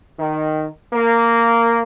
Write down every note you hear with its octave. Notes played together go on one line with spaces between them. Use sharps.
D#3
A#3